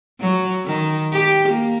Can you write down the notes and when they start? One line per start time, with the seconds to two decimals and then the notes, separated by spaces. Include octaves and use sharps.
0.20 F#3
0.66 D#3
1.13 G4
1.48 A#3